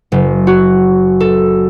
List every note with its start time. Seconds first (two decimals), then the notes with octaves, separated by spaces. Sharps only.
0.12 F#1
0.47 F#4
1.20 A4